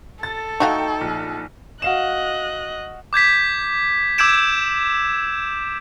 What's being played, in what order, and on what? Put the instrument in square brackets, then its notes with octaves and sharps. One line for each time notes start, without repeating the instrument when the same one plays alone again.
[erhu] A4 [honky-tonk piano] A6
[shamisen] A3 F#4 F5 [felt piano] D#4 [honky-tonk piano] G5 C#6
[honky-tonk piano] A#1
[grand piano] F#4 F5 E7 [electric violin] D#5 F#6
[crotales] D6 G6 G#6 B6
D6 E6 G6 G#6 D7 E7